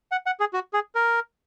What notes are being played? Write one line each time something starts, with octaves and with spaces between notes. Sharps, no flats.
F#5
F#5
G#4
F#4
G#4
A#4